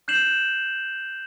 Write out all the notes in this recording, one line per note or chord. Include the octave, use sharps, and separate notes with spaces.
F#6 G6 C7 E7 F#7